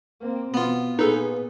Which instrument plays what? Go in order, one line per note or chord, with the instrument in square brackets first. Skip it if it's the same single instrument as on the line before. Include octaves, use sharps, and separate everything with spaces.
[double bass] A#3 C4
[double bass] B2 [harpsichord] B3 F4
[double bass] A#2 [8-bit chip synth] D#4 A4 [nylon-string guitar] G#4 B4